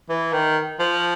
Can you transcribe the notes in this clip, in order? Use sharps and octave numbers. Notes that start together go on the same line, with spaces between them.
E3
D#3
F3